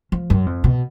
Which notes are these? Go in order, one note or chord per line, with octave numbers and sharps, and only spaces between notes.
F3
F#2
F2
B2